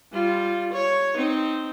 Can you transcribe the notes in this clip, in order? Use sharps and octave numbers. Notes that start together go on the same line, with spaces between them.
G3 F4
C#5
C4 D#4